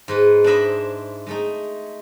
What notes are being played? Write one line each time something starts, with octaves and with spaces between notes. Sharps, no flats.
G#2 G#3 B4
D4 E4 C5 D#5 E5 B5
G#3 A3 D#4